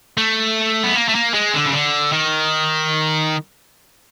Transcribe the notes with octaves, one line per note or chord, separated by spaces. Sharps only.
A3
B3
A#3
A3
A#3
G#3
D3
C#3
D3
D#3